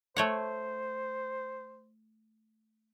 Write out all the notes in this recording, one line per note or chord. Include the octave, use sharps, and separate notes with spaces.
A3 C5 C#5 F#5